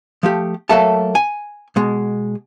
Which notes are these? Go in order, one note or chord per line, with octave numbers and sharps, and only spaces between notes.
F3 A3 G4
F#3 A3 A#3 A4 E5 A5
G#5
B2 G#3